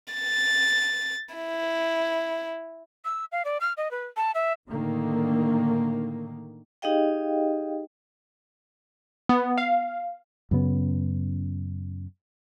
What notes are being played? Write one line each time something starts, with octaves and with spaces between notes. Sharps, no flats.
A6
E4
E6
F5
D5
F6
D#5
B4
A5
E5
A2 D3 D#3 A#3
D#4 G4 G#4 D#5 F5 G5
B3
F5
F#2 C#3 B3